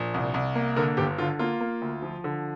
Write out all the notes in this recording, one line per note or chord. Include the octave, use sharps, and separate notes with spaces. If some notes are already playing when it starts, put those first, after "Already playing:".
Already playing: A#1
C2
C2
A#3
D3 A#4
G1 G4
D3 F4
A#3 F4
A#3
D2
F3
D3